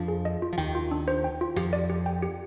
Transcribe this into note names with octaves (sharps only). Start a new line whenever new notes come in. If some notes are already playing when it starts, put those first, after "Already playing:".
Already playing: F2 F3 D4
G#4
D#5
F4
F3
D#2 D#3 G5
F4
D4
C5
G5
F4
F2 F3 G4
D5
G4
G5
G4